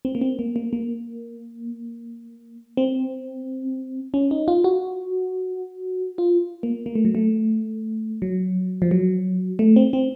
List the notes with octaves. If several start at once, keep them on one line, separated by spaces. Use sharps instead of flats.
C4
A#3
C4
A#3
A#3
A#3
C4
C#4
D#4
F4
F#4
F4
A#3
A#3
A3
F#3
A3
F#3
F3
F#3
A3
C4
C4